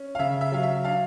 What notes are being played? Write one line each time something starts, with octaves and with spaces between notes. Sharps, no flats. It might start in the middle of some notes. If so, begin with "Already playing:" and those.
Already playing: C#4
F5
C#3 E5
E5
F#3 F5
E5
D4 F5